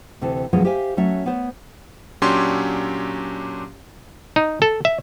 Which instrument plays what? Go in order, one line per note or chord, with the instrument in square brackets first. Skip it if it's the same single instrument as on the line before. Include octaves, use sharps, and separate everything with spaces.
[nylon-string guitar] D2 C3 E3 A4
B2 F3 F#3 G#3 C#4
G4 C5 E5 F5 G#5
F#3 A3 C#4 F#4 C#5 E5
B3 C5 C#5
[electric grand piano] A#2 F#3 C#4 D4 G4 C6
[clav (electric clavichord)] D#4
A4
E5